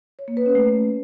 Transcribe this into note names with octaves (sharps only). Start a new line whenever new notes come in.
C#5
A#3
B4
C#4
A3